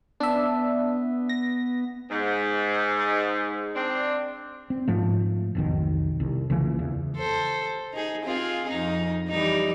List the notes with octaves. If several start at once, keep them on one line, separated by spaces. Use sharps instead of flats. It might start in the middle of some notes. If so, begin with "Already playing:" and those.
B3 D4 E5
A#6
G#2
C4 D4
C4
G#2 F3 A3
F1 B1 D#3
C2
C#2 C#3 E3 A#3
E2
A4 C5
D#4 G#4
C4 F4 G#4
F2 D#4
E3 G3 D#4